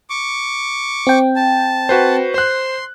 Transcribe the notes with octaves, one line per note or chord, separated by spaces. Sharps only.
C#6 D6
C4 G5
A5
F#4 B4 C5
C5 C6 F#6